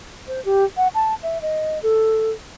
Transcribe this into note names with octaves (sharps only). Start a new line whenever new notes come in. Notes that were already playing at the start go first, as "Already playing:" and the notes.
C5
G4
F#5
A5
E5
D#5
A4